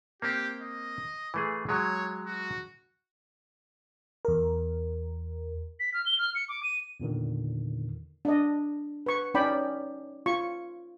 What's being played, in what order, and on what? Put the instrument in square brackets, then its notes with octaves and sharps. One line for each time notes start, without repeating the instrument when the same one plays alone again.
[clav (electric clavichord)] A#3 C4 [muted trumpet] G4
[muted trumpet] D#5
[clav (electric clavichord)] E3 A3 G#4
[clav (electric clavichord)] F#3 G#3 [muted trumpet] C#5
[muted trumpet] F#4
[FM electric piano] E2 A#4
[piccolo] B6
F6
G7
F6
C#7
D6
D#7
[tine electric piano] E2 A#2 D3 D#3
[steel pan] D4 D#5
B4 C#6
C#4 D#4 D5 G5 B5
F4 C#6